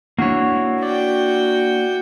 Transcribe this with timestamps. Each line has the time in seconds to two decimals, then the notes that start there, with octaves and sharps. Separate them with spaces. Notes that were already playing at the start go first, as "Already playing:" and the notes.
0.18 A#3 D4 E4 F#4 C#5
0.83 F#4 D5 G5